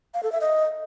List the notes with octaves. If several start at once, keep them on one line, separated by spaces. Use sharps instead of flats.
F5
A4
E5
D#5